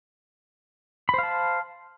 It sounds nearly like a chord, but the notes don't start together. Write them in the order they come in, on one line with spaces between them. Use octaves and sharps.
B5 C5 F5 A5